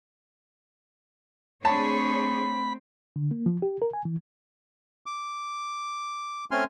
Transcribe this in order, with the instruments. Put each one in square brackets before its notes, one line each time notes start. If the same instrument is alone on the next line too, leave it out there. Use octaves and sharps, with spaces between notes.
[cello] A3 C4 [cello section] D4 G#4 C#5 [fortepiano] A5 [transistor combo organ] B5
[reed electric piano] D3
A#3
F3
G4
A#4
G#5
E3
[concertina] D6
A3 C4 C#4 G#5 C6 F6